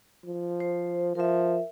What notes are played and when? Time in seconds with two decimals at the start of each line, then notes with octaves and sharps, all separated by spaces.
0.25 F3
0.60 C5
1.15 F3 A#4 E5